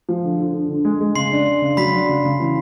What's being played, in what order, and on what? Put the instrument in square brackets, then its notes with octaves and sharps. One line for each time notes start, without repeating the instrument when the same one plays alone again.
[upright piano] F3
D3
D3
D3
D3
G#3
G#3
[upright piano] C#3 [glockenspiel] C6 C7
[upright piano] D4
D4
C#3
[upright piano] F#3 [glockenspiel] B5 B6
[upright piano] D4
C#3
C#3
E3